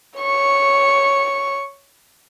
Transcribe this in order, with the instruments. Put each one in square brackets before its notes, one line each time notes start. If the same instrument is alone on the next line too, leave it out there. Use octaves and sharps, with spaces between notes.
[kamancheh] C#5 C#6